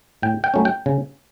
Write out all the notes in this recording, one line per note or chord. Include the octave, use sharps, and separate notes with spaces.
A2 G5
G5
F#3 A3 C#4
G5
C#3